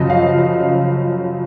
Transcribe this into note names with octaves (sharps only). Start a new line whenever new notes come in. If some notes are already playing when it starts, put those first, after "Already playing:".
Already playing: F#2 C#3 F3 D#5
F5